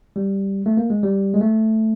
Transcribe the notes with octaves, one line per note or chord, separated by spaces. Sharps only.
G3
A3
A#3
G#3
G3
G#3
A3